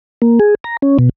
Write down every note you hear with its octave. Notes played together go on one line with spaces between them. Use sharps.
A#3
G#4
A#5
C#4
B2